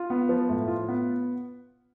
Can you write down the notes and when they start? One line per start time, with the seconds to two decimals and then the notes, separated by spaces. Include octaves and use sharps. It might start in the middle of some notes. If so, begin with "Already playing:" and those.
Already playing: F4
0.10 B3
0.29 F3
0.49 A2
0.68 F4
0.88 B3